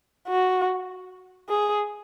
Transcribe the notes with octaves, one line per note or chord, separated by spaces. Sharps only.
F#4
G#4